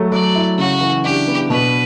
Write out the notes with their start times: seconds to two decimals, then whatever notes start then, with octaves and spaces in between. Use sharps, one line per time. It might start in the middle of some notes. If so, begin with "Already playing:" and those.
Already playing: F#3 A3
0.12 F#3 D5
0.35 E4
0.58 C#3 F#4
0.81 E3
1.04 D4 G4
1.28 B3
1.50 B2 B4